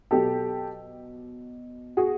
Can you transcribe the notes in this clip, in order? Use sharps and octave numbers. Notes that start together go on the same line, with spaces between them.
B2 F#3 G4 A4
F#4 G#4